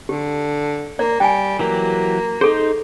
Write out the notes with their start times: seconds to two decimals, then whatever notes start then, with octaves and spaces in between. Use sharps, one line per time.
0.09 D3 G4
0.99 A#3 D5
1.20 G3 G5 G#5
1.59 E3 F#3 A#3 G4
2.41 D#4 G#4 A4 C5